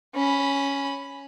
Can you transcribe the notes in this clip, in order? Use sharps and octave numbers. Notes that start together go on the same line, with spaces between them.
C#4 B5